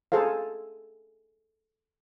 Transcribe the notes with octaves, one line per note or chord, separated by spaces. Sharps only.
G#4 A4 C5 F5